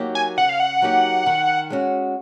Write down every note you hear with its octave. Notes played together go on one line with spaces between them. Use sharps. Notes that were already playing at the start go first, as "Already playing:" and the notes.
Already playing: F#3 A#3 D#4 G4
G#5
C#3 F#5
F5
F#5
F#3 A#3 D#4 G4
D#3
G#3 C#4 F#4